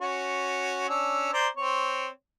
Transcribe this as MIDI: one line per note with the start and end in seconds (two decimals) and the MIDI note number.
0.01 0.87 61
0.01 0.87 66
0.89 1.33 61
0.89 1.33 62
0.89 1.33 88
1.33 1.48 72
1.33 1.48 74
1.33 1.48 82
1.57 2.08 60
1.57 2.08 73